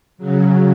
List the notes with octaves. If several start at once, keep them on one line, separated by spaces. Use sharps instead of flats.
C#3 F#3